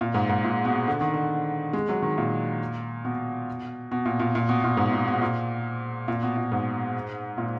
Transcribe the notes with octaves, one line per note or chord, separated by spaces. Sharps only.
A#2
G#2
G#2
A#2
B2
D3
D#3
D3
G#3
F#3
D#3
A#2
B2
B2
A#2
A#2
A#2
B2
A#2
G#2
A#2
B2
A#2
A#2
B2
A#2
G#2
A#2